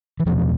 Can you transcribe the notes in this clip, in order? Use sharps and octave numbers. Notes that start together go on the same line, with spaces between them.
E3
E2 B2 F3